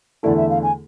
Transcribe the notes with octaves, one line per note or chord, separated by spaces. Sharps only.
E2 D3 A3 E4 A4 D5
E5
F5
G#5